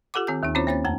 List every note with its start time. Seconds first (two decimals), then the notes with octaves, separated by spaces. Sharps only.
0.14 F4 G4 A4 F#5 D6
0.27 D#3 C4 G#5 G6
0.43 D#2 D#3 A#3 D#4
0.55 C4 C#4 E4 F4 C5 C#5
0.67 D#2 A#3 C#4 C5 C#5 A6
0.85 F2 A3 G5 A5 A#5